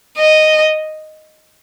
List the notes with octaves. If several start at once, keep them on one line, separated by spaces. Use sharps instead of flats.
D#5